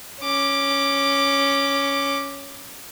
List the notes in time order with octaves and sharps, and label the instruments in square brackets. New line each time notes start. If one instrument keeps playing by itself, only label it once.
[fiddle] C#4 D6